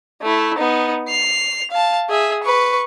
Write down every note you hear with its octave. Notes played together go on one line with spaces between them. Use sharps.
A3 E4
B3 D#4
C7 F7
F5 A5
G#4 E5
B4 C#6